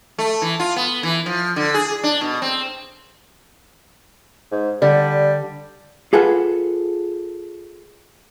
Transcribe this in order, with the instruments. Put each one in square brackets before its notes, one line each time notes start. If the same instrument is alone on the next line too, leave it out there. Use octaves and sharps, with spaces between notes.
[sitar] A3
E3
F4
B3
E3
F3
D3
G#4
D4
B2
C4
[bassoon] G#2
[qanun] D3 [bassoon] G3
[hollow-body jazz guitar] F4 G#4 A4 B4 F#5